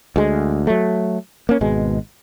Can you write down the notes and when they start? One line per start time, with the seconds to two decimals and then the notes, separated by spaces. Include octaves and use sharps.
0.16 D2 G#3
0.67 F#3 A3
1.49 A#3 C#4
1.61 G#1 B2 G#3